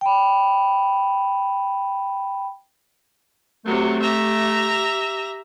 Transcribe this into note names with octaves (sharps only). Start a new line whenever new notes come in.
G5 B5
C3 F#3 A3
G4 E5 A#5